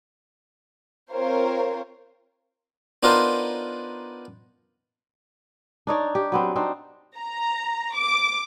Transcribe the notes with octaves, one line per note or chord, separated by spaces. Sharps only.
C4 F4 A#4 C5 C#5
B3 D4 D#4 F4 A#4 C5
D4 D#4 C#5 D5
G4
F#3 B3 C4
C4 D4 D#4
A#5
D6